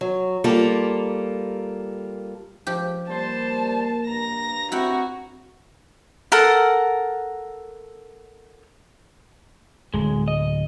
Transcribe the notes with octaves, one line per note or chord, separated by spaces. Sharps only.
F#3
G3 A#3 F4 A4
C#2 F3 G4
G3 A#3 C5 A5
G2 A#5 A#6
C4 E4 F#4 F#5 G5
A4 A#4 F#5
D1 G#3
D#5